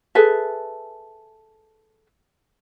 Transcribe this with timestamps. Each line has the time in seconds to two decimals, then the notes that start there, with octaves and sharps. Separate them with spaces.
0.15 G#4 A4 B4 E5